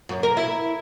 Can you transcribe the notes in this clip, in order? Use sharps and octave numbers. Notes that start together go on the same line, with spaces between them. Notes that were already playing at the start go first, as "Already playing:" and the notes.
F#2
A#4
E4